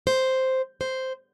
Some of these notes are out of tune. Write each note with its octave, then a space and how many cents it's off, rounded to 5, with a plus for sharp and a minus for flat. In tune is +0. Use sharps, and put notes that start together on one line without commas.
C5 -5
C5 -5